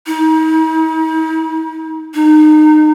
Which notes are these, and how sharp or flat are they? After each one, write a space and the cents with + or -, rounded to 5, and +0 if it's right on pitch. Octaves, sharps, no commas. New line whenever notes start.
D#4 +45
D#4 -25